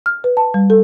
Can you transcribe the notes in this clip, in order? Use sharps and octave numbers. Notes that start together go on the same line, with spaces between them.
F6
B4
A5
G3
A4